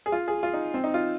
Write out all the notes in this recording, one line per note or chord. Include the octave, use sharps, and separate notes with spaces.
G#4
F4
G#4
F4
D#4
C4
D#4
F4